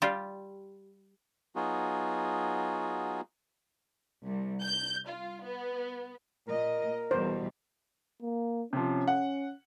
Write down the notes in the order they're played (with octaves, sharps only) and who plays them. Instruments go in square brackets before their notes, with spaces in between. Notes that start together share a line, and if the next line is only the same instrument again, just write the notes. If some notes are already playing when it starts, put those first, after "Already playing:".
[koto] G3 F4 G4
[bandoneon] F#3 B3 D#4 F4 F#4 G#4
[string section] C2
G6
F4
B3
[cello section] A#2 D#5 [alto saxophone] A#4
[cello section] E2 B2 G3 [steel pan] C5
[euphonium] A#3
[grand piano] C3 F3 [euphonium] C#4
[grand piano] F#5